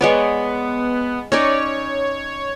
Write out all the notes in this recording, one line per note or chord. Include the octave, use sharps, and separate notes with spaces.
G#3 B3 C#5 D5
C#4 D#4 C#5 D5